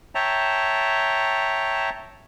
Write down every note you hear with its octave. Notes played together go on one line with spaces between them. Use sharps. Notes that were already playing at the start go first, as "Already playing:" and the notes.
C#5 E5 G5 A5 A#5